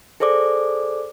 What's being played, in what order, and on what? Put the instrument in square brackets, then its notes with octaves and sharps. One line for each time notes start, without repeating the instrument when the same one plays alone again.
[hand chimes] G#4 A4 C5 D5 D6